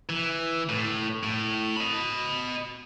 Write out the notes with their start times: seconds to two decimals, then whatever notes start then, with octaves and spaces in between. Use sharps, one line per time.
0.09 E3
0.69 A2
1.23 A2
1.76 D#5 B5